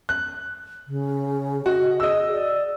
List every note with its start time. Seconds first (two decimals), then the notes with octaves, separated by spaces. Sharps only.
0.09 F#6
0.88 C#3
1.66 F#4 D#5
2.00 G#4 D#5 E6
2.32 D5